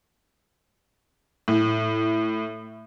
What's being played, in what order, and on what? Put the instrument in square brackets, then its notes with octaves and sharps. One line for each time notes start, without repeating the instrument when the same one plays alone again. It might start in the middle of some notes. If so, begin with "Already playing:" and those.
[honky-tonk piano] A2